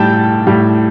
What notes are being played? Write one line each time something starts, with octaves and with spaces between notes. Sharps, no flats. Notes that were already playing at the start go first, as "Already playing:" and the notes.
Already playing: A2 G3 G5 A5 G6
A2 G3